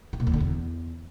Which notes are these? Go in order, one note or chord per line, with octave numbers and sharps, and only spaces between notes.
C3
A#2
E2
D3
E2